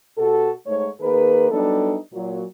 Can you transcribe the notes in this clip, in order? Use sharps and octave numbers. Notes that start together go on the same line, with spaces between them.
B2 F#4 G4 A4
G#2 A3 C#5
D#3 A#3 G#4 A#4 B4
F#3 G3 B3 D4 D#4 A4
A#2 F#3